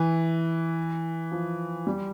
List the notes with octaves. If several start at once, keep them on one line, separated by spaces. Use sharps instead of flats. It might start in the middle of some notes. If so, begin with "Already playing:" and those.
Already playing: E3
F3
G3